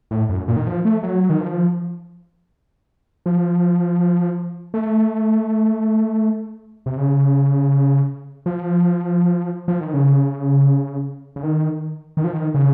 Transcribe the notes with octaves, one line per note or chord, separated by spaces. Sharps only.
A2
F#2
A#2
D#3
F3
A3
F#3
D#3
F3
F3
A3
C3
C#3
F3
F3
D#3
C#3
C#3
D#3
D#3
F3
D#3
C#3